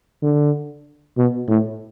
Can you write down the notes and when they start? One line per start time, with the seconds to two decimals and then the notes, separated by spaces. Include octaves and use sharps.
0.23 D3
1.17 B2
1.48 A2